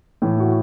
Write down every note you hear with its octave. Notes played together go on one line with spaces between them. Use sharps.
A2 E3
F#4